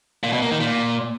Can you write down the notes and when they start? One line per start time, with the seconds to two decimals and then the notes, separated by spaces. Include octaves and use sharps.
0.23 A#2
0.33 B2
0.42 A#3
0.51 D#3
0.60 A#2